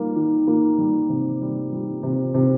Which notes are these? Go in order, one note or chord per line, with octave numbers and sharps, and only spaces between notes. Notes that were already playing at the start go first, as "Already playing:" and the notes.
Already playing: D#3 G3 A#3
D#3
A#3
G3
C3
G3
G3
C3
C3